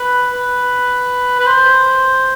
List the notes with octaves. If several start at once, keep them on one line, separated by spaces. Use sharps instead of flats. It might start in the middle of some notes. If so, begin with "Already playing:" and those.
Already playing: B4
B4
B4
C5